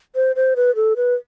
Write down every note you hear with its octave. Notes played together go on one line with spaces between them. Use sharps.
C5
C5
B4
A4
B4